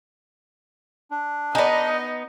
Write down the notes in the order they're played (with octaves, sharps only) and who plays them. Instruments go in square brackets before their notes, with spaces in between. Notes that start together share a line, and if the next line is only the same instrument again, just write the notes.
[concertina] D4
[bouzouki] B3 D#4 [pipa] G#4 D5 [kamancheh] D#5